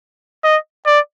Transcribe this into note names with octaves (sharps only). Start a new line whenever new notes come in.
D#5
D5